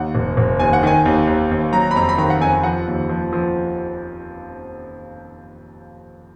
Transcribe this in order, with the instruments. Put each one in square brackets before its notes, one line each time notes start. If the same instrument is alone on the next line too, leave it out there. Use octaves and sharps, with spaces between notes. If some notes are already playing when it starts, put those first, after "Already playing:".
Already playing: [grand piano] D#2 F#5
F1
F1
D#2 G#5
F#5
D#3 G#5
D#2
D#2
D#2
F#3 A#5
B5
F2 A#5
B5
D#3 A#5
F#5
F2 G#5
F3 F#5
D#2
F3
F3